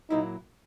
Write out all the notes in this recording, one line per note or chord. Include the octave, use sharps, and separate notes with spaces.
A#2 F#3 A#3 D#4 E4